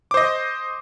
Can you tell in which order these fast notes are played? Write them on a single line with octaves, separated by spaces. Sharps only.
D6 C5 D#5